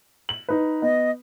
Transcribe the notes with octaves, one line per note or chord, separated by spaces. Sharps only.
F#7
D#4 B4
B3 D#5